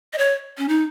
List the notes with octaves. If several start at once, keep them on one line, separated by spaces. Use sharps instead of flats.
D#5
C#5
C#4
D#4